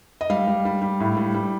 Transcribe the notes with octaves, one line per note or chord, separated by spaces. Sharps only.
D#5
G3 F5
G3
G3
G3
A2
G3
G3